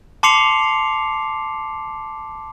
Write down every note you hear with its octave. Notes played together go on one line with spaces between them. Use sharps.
A5 C6 D6 C7 C#7 F7